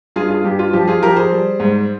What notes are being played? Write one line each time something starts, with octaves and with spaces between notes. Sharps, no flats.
G2 F4 G#4
F4 G#4
G2 G4
F4
F3 G4
F4 G#4
F3 G4 A#4
G#4 C5
G3
G#2